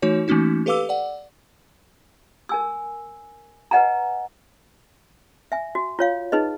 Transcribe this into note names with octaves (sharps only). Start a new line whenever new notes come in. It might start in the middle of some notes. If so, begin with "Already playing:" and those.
E3 A3 D#4 F#4 C#5
E3 A3 A#3 C#4 D#4 F#4
G4 A4 B4 F5 D6 E6
D5 F#5
A#4 G#5 E6
B4 C#5 D#5 F#5 G#5 A#5
E5 G#5
F#4
F4 C#5 F5
D#4 G#4 B4 D#5